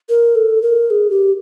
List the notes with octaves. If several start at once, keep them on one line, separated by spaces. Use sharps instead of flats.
A#4
A4
A#4
G#4
G4